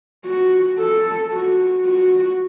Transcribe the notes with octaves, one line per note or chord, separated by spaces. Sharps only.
F#4
A4
F#4
F#4